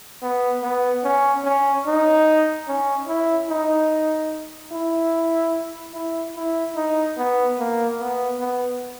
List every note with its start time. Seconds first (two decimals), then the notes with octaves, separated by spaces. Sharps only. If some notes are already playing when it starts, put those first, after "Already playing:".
0.22 B3
0.63 B3
1.04 C#4
1.44 C#4
1.86 D#4
2.68 C#4
3.08 E4
3.49 D#4
4.72 E4
5.94 E4
6.36 E4
6.76 D#4
7.17 B3
7.59 A#3
7.99 B3
8.39 B3